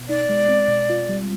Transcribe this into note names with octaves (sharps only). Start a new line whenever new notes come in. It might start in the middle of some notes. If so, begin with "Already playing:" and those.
Already playing: B2 B3
D#4 D5
G#3
C4
B2
F4
G3